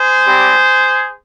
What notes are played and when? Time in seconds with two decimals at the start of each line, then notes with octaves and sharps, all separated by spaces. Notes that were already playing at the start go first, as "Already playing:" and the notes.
Already playing: G#4 C5
0.25 G3 C4 G4